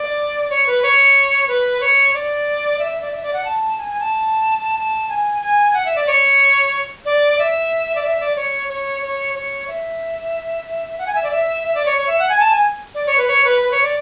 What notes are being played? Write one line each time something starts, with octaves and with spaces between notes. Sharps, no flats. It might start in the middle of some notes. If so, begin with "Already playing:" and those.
Already playing: D5
C#5
B4
C#5
B4
C#5
D5
E5
D5
E5
D5
F#5
A5
G#5
G#5
A5
A5
G#5
G#5
F#5
E5
D5
C#5
D5
E5
D5
E5
D5
C#5
C#5
C#5
C#5
E5
F#5
G#5
E5
D5
E5
E5
D5
C#5
C#5
E5
F#5
G#5
A5
G#5
D5
C#5
B4
C#5
B4
B4
C#5
D5